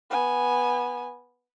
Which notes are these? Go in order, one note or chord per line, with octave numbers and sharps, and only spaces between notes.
B3 G#5